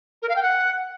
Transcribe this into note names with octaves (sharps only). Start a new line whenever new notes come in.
A#4
F5
G5
F#5